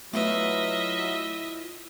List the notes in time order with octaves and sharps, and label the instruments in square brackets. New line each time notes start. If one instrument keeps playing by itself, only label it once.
[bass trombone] F#3 [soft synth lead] A3 [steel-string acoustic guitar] E4 F4 B4 [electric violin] D#5 E5